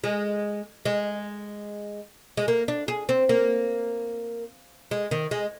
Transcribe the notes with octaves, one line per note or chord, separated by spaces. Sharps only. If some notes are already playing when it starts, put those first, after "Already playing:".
G#3
G#3
G#3
A#3
D4
G#4
C4
A#3
G#3
D#3
G#3